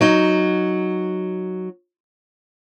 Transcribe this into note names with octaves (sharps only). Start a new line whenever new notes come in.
F#3 D#4